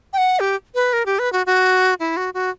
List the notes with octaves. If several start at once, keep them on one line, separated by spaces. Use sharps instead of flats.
G5
F#5
G4
B4
A#4
G4
B4
F#4
F#4
E4
F#4
F#4